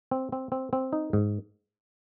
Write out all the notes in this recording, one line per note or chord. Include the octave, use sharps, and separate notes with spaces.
C4
C4
C4
C4
D#4
G#2